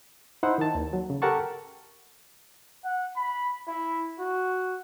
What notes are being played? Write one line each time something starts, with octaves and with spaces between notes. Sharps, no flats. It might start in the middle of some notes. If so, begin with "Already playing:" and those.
D#4 E4 C5 F#5
D#3 A5
D#2
F#3
C#3
G4 A4 A#4 F#5 A5 C#6
F#5
B5
E4
F#4